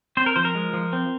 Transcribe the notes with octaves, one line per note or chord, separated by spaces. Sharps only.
C4 C5
A#4
F3 C5
A#4
G#3
F3
C4